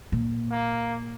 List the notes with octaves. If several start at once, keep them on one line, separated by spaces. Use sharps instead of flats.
A#2
A#3